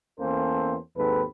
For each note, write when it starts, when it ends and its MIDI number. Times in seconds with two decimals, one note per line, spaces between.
0.19 0.75 40
0.19 0.75 58
0.19 0.75 60
0.19 0.75 61
0.19 0.75 69
0.19 0.75 72
0.97 1.23 39
0.97 1.23 44
0.97 1.23 60
0.97 1.23 69
0.97 1.23 71